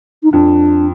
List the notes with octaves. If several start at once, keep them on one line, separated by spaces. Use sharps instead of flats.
D#4
F2 D4